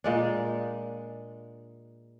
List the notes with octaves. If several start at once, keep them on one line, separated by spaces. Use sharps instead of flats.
A#2 G#3 D4